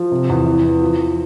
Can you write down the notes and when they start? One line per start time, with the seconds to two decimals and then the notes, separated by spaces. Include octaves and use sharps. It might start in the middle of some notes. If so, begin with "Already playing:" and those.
Already playing: F3
0.11 C3
0.29 E2
0.46 E3
0.64 E3
0.81 F3
0.98 F3